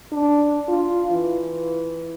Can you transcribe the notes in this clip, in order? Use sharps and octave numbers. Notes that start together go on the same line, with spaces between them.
D4
F4
E3